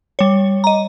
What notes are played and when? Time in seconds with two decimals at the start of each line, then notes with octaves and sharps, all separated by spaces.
0.19 G3 C#5
0.64 D#5 A#5